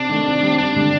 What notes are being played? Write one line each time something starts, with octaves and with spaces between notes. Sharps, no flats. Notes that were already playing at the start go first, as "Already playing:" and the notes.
Already playing: C3 D4
D#3 A3
C3
G3 C4
G2 D4
D3 G3